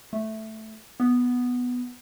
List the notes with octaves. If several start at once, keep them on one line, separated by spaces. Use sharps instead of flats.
A3
B3